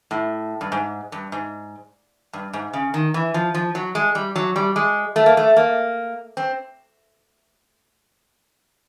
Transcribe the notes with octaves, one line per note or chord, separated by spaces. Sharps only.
A2
G2
G#2
G2
G#2
G2
G#2
C#3
D#3
E3
F3
F3
F#3
G#3
G3
F#3
G3
G#3
A3
A#3
A3
A#3
C4